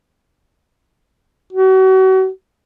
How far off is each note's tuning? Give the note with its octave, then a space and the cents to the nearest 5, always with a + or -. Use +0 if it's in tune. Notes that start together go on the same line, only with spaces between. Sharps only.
F#4 +35